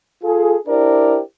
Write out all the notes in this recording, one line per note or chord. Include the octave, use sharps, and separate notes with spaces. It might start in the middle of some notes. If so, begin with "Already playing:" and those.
F4 G#4 A4
D4 E4 G4 A#4 C5 D5